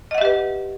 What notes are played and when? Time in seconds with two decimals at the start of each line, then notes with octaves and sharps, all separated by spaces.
0.11 D#5
0.14 F#5
0.18 E5
0.21 G4
0.25 B4